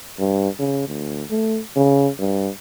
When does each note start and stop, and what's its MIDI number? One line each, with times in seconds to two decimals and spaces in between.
0.19 0.49 43
0.59 0.84 49
0.88 1.23 38
1.30 1.60 57
1.76 2.09 49
2.19 2.50 43